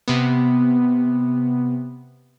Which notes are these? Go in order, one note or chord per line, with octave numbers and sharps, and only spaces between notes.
C3 B3